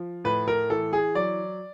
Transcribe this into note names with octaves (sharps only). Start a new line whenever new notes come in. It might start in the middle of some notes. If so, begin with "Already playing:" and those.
Already playing: F3
A2 B4
A#4
E3 A4
G#4
F#3 D5